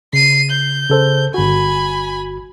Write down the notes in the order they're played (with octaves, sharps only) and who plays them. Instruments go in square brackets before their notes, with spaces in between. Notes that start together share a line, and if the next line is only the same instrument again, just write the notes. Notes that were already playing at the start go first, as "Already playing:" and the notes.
[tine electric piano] C#3 [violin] C7 D#7
[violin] G6
[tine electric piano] C#3 A4 C5
[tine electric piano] G1 F#4 [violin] G#5 B5